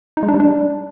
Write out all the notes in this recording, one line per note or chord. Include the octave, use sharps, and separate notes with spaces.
D#4
G#3
D4
G3
D4